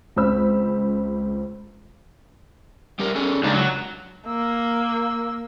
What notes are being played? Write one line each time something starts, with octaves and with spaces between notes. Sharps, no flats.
C#2 C4 C#4 C5 B5 E6
G3 G4 A#4
C#4 G#4 A4
D#2 C#3 G#3 D4 A#5
F#3
A#3 E6